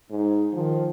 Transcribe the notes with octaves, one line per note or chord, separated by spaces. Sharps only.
G#2 D#4
D#3 F3